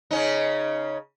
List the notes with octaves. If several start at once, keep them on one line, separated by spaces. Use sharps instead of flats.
C#3 C#4 D#4